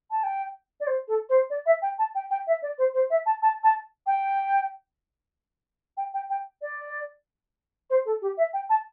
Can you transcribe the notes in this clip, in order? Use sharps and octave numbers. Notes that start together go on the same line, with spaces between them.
A5
G5
D5
C5
A4
C5
D5
E5
G5
A5
G5
G5
E5
D5
C5
C5
E5
A5
A5
A5
G5
G5
G5
G5
D5
C5
A4
G4
E5
G5
A5